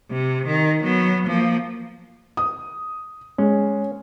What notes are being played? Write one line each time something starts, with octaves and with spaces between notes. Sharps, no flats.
C3
D#3
F#3 B3
F3 A#3
D#6
G#3 C#4